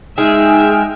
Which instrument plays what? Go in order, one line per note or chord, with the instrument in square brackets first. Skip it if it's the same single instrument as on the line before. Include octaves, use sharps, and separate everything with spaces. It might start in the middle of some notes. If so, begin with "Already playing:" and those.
[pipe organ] G#3 G5 F6 [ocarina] D#4 [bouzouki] G#4 [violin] E5